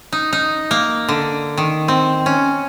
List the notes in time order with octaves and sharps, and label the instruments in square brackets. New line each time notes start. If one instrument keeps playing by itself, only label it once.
[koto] D#4
D#4
A#3
D3
D#3
C4
C#4